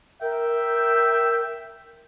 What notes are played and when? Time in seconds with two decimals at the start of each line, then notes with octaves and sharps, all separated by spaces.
0.22 A#4 E5 G5